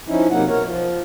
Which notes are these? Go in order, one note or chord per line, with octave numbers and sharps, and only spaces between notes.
F3 C#4 D#4 E4
C3 F#3 A#3 D#4 F#5
B2 A#4 C#5
F3 F4